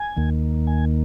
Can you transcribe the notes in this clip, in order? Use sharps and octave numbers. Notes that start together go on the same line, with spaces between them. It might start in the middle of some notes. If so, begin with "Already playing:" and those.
Already playing: G#5
D#2 D#3 A#3
G#5